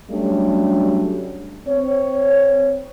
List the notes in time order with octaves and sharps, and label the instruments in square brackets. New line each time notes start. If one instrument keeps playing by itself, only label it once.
[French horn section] F#3 G3 A3 C#4 D4
C4 C#5